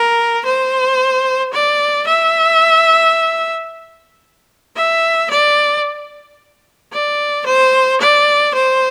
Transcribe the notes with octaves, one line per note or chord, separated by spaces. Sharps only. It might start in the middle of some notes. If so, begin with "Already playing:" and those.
Already playing: A#4
C5
D5
E5
E5
D5
D5
C5
D5
C5